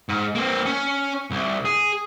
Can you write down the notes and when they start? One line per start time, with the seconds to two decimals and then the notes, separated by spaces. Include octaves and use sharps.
0.09 G#2
0.35 A#3 C4
0.66 C#4
1.31 C2
1.65 G#4